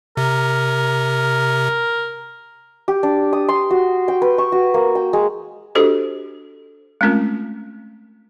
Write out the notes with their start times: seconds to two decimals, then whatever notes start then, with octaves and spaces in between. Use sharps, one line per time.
0.17 C3 A#4
2.88 G4
3.03 D4
3.33 D#6
3.48 C6
3.70 F#4
4.08 G5
4.22 B4
4.38 C#6
4.52 F#4
4.74 A#3
4.95 G5
5.13 G#3
5.75 D4 F#4 G4 A4 C5 D#5
7.01 G#3 A3 C4 C#4 F4 A#4